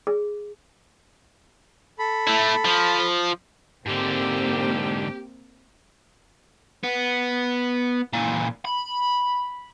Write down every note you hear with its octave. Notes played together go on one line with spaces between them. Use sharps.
G#4
A4 B5
A3 E4
F3
G#2 D3 A#3 C4 G4
B3
A#2 E3
B5